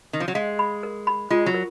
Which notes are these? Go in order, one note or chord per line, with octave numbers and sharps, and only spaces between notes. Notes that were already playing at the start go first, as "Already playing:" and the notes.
D#3
F3
F#3
G#3 F5
B5
A#4
B5
G#3 F4
F#3
A#4